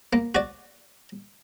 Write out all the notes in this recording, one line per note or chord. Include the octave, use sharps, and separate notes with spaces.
A#3
F#4 D5